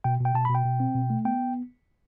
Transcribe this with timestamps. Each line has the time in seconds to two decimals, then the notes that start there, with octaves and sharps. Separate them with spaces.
0.04 B2 G5
0.20 B2
0.25 G5
0.34 B2 A5
0.45 B5
0.50 B2 G5
0.65 B2
0.80 C4
0.95 B2
1.10 A3
1.25 B3 G5